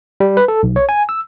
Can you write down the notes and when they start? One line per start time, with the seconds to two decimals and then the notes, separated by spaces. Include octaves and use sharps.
0.20 G3
0.37 B4
0.48 A4
0.63 B1
0.76 C#5
0.89 G#5
1.09 E6